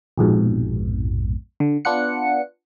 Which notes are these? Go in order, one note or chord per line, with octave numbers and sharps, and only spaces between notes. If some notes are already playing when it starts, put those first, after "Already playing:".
A#1 F2 G#2 B2
D3
B3 D4 F4 F#5 C#7